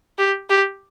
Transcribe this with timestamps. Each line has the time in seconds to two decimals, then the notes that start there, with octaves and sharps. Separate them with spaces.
0.18 G4
0.49 G4